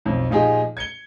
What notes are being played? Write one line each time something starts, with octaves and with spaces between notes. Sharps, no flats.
B1 F2
A#2 F3 D#4 G4 G#4
G#6 C#7 G7